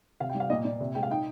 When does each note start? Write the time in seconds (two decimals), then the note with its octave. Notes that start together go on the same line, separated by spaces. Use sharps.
0.20 C3 F5
0.30 G5
0.35 G3
0.40 F5
0.50 A#2 D#5
0.65 A#2 D5
0.80 C3
0.95 G#3 G5
1.03 F5
1.10 D#4 G5